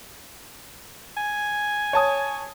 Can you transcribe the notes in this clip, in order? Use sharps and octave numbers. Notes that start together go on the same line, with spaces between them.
G#5
C#5 A5 D#6